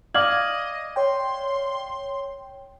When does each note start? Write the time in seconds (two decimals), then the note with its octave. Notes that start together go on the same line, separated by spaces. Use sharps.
0.15 D5 D#5 F5 D6 F6 G#6 F#7
0.96 C#5 G5 C6